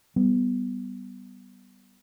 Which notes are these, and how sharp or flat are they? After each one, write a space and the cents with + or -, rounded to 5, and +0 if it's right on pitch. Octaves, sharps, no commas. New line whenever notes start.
G3 -20 B3 +0